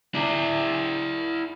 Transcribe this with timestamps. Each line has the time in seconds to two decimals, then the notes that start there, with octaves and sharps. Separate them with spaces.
0.14 E4 D5